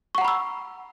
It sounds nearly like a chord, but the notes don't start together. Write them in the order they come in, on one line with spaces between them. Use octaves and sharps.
C#6 F#5 A#5 B5 E6